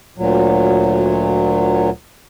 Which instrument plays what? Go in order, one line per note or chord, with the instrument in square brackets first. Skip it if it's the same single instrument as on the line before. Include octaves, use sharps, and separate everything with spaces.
[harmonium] D2 A#2 F#3